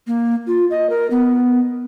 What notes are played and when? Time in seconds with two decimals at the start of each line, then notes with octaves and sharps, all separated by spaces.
0.07 A#3
0.47 F4
0.70 D#5
0.90 A#4
1.11 B3